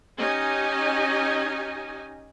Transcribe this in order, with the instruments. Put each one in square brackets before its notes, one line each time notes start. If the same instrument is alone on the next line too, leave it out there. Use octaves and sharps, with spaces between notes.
[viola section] C#4 D#4 G4 D#5 G#5